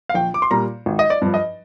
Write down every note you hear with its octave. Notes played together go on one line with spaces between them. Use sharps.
F5
A#1 G5
D6
C6
A#2 G3 A#5
G#1
D#5
D5
G2 F3
D#5